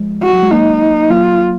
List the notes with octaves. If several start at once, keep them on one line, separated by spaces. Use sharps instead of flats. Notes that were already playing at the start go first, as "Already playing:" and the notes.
Already playing: F3 G#3
F#4
F#3
G#3
F#3 A#3 D#4
F#3 A#3 F4